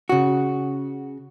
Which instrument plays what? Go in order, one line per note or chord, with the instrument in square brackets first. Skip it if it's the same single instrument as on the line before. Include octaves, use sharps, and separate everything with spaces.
[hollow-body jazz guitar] C#3 F#4